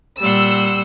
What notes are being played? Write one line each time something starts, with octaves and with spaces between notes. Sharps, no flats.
A#2 G3 F#5 C6 E6